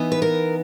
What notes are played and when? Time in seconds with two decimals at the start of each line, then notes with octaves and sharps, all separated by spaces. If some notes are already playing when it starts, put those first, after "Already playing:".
Already playing: E3 B3 D#4
0.12 B4
0.22 A#4